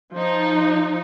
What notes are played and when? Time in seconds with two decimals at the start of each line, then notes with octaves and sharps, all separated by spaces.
0.13 F3 D#4